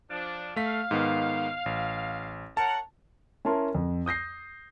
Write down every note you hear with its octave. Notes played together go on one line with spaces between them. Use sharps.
F3 D4
A3 F5 B6
G#2 D#3 B3
A1
A#4 C#5 F#5 A5
C#4 E4 A#4 A5 C6
F2
D#6 G6 A#6 C7